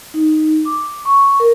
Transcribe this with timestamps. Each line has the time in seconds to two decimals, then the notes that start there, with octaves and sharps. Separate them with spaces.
0.14 D#4
0.65 D6
1.05 C#6
1.40 A#4